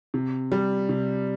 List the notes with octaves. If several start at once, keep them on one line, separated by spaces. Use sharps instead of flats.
C3
G3
C3